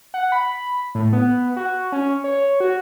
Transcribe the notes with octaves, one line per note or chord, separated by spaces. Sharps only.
F#5
B5
A2
B3
F#4
C#4
C#5
F#4